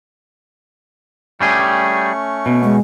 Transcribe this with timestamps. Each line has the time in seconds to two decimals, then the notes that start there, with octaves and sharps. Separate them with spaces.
1.41 G3 A3 C#4 G4 G#4 C#6
2.46 B2 B3
2.64 G#3